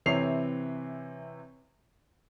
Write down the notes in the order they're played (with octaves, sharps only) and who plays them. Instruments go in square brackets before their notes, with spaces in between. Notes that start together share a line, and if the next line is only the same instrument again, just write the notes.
[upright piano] C3 E3 C4 C#5 C7 F7